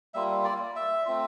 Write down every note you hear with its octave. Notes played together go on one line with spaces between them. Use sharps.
G3 A#3 F4 E5
D5
E5
A3 C4 F4